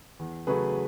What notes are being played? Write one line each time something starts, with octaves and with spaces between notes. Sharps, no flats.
E2
C#3 F#3 A3 G#4 B4